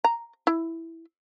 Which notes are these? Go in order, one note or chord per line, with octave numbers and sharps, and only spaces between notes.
A#5
E4